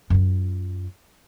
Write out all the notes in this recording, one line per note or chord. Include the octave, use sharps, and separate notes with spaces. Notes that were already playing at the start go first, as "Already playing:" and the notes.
F#2 F4